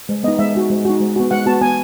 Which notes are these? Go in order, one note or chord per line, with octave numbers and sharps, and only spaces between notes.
G#3
B3 D#4 D#5
G#3 E5
D#4 F#4
G#3
D#4 F#4
G#3
B3 F#4
G#3 F#5
B3 F#4 A5
B3 G#5